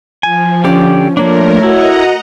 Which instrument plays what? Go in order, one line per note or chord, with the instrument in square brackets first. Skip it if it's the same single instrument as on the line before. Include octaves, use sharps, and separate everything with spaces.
[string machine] F3 [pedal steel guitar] G#5
[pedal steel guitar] D3 G4 D5 [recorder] C#4
[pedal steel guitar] F3 A#3 D4 [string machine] A3 A#4 [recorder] C#5
[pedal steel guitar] E4 [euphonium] F#4 [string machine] D#5 F#5 A#5